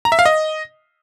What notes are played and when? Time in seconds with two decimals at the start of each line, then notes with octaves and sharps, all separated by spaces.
0.05 A#5
0.12 E5
0.19 F5
0.26 D#5